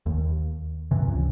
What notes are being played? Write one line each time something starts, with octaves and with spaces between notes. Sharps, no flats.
D#2
G2 C3 E3
C#2